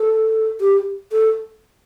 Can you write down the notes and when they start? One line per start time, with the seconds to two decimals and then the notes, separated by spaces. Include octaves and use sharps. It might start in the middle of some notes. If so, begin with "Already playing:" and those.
Already playing: A4
0.60 G4
1.12 A4